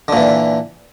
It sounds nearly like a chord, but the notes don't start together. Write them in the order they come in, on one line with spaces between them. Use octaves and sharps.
D3 A#2 E3